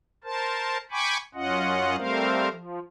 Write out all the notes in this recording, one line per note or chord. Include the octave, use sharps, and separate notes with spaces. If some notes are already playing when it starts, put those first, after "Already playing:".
A#4 C5 A5
G5 G#5 B5 C#6 D6
F#2 C#4 F4 D#5 F#5
G3 A3 C4 A#4 C5 F5
F3